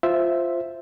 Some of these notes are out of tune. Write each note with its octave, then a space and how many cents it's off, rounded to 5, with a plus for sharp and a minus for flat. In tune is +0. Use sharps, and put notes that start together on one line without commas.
F4 +0 C5 +0 E5 +0